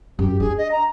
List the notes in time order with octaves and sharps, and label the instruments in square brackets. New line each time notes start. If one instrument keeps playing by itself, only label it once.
[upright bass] F#2 [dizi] G4
[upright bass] D4 [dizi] G#4
[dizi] D#5
A#5